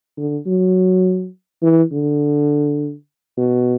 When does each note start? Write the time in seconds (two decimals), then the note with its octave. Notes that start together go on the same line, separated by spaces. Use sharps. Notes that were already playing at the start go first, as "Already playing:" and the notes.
0.18 D3
0.46 F#3
1.62 E3
1.92 D3
3.37 B2